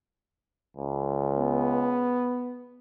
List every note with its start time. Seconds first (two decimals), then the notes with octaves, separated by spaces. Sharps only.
0.77 C#2
1.39 B3